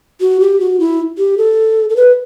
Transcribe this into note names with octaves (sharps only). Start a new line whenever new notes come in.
F#4
G4
F#4
E4
G4
A4
A4
B4